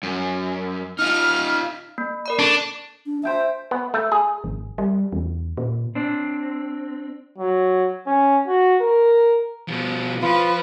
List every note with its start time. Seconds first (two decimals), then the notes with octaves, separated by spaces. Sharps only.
0.03 F#2
0.99 D#4 F4 F6
1.98 A#3
2.26 A#4 D5 B5
2.39 D4 A4 A5 C#6
3.06 D4
3.23 C5 E5 G5 A5
3.71 B3
3.94 A3
4.12 G#4
4.44 G#1
4.78 G3
5.13 E2
5.57 A#2
5.95 C4 D4
7.38 F#3
8.07 C#4
8.47 F#4
8.81 A#4
9.68 B2 F3
10.22 F3 F4 B4